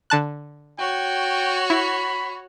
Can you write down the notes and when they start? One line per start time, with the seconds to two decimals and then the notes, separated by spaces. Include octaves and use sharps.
0.10 D3 A5 F#6
0.79 F#4 C#5 G5
1.70 E4 B5